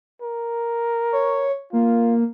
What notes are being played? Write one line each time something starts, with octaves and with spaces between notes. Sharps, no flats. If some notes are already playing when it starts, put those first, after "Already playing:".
A#4
C#5
A#3 F4